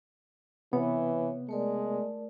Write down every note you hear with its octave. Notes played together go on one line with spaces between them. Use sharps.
C3 E3 B3 C#5
G#3 A3 A#4 D5